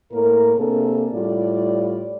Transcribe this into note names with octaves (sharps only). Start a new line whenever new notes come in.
A2 A#3 A#4
C3 A#3 D4 G#4 A4
A2 G3 F4 D5